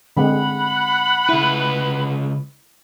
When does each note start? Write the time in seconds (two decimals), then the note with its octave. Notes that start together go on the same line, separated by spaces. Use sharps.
0.17 D3 G#3 C4 F#5 B5
1.29 C#2 E4 B4